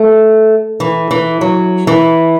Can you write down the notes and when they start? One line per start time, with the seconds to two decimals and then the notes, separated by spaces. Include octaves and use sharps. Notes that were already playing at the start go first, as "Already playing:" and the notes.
Already playing: A3
0.80 E3
1.11 E3
1.41 F#3
1.87 E3